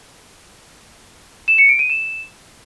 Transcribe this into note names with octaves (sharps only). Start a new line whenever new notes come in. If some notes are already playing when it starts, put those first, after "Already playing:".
E7
C#7
D7
D#7
E7